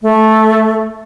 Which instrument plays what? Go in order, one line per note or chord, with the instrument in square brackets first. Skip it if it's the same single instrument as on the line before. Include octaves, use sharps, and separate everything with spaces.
[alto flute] A3